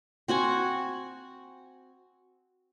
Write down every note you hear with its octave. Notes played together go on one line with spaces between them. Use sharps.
C4 F#4 F#5 G#5